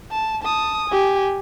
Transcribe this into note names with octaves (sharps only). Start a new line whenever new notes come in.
A5
A5 D#6
G4 G#5